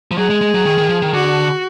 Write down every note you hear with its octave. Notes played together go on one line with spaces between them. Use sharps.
F3
F#3 G#4
G#3
G#3
F#3
D#3
D#3
F3
D#3
D3 F#4